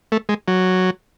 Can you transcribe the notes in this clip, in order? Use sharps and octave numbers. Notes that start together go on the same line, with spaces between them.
A3
G#3
F#3